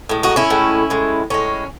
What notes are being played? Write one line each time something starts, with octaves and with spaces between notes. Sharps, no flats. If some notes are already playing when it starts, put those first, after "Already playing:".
A2 G#3
D#4 F#4
C#4 E4
A2 G#3
A2 G#3
A2 G#3 C#4